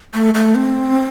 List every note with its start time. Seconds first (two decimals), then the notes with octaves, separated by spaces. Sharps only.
0.14 A3
0.34 A3
0.55 C4